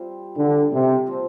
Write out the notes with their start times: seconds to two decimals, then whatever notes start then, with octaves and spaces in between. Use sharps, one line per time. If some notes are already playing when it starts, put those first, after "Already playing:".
Already playing: G3 C4 F4 C5
0.37 D3
0.72 C3
1.06 A#2 F3 C4 F4